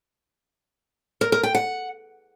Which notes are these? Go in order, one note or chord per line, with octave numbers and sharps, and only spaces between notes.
A#4
A#4
G5
F#5